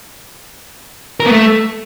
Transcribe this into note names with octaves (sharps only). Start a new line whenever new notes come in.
A#4
B3
A3